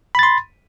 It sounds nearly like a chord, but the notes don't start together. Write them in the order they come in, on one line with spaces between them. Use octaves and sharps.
B5 A6 C6